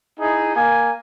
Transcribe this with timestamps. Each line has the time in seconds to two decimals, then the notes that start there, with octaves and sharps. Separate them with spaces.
0.19 D#4 E4 G#4
0.55 A#3 G#5